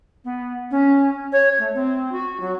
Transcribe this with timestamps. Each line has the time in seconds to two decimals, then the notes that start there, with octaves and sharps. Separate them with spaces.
0.24 B3
0.70 C#4
1.32 C#5
1.58 A3
1.74 C4
2.11 F#4
2.39 F#3